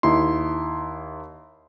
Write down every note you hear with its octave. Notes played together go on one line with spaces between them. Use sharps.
D#2 D#4 E4 C6